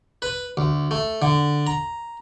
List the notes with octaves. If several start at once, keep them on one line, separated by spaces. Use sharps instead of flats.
B4
D2
A3
D3
A#5